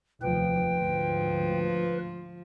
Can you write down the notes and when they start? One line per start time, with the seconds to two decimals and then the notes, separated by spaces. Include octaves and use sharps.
0.22 F1 D#2 F3 B4 G5
0.76 D2 G#2 F3